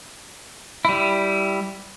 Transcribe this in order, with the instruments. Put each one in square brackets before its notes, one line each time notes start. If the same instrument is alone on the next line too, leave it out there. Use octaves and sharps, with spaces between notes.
[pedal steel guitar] G3 E4